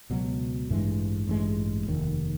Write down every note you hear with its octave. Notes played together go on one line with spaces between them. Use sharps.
C#2 B2 F#3
A1 G2 E3 G#3
A1 G2 E3 G#3
F1 D#2 D#3